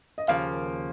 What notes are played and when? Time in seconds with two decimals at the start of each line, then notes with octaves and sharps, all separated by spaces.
0.18 D#5
0.28 D#2 C#3 F3 A#3 F5